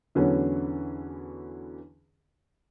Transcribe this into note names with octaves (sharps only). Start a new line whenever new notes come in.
E2 D3 E3 F#3 B3 C#4